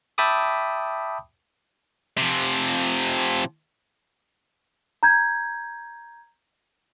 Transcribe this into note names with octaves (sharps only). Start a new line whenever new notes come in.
E5 G5 A5 B5 D6 D#6
C3 F3
A#5 G6 G#6